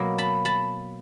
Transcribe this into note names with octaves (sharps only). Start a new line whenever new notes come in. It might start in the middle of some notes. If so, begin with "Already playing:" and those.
Already playing: B2 F#3 A#3
A5 B5
A5 B5